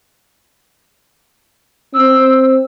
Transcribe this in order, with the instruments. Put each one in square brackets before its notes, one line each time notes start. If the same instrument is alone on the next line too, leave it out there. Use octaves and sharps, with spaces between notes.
[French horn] C4 [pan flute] E6